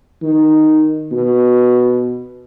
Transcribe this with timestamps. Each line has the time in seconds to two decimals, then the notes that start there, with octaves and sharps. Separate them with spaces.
0.23 D#3
1.12 B2